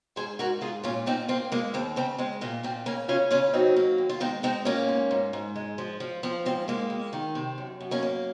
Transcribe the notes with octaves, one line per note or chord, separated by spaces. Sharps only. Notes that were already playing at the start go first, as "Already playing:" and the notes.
G#2 G#4 C5
G#2 F#4 A#4
G#2 F4 G#4
A#2 C#4 F4
A#2 C4 D#4
A#3 C4
G#3 A#3
D#2 C4
C#3 C4
G#3 C4
A#2 A#3
A#2 C4
C#3 A#3 C#4
C#3 C#4 F4
C#3 C#4 F4
F#3 C4 D#4
A#3
D#2
F4
G#3 C4 D#4
G#3 C4 D#4
A#2 A#3 C#4
G#2
G#2
G#2
G#3
F3
F3
F3 C4
G#2 C4
G#3 A#3
F2
D#3
C3
F#2
F#2
A#3 C#4
A#3